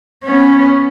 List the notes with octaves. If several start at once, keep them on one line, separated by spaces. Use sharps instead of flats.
B3 C#4